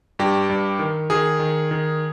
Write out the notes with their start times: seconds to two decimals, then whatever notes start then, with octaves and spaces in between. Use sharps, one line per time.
0.19 G2 G4
0.49 G2
0.79 D#3
1.10 D#3 G#4
1.39 D#3
1.71 D#3